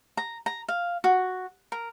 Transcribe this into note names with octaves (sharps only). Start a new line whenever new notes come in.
A#5
A#5
F5
F#4
A#4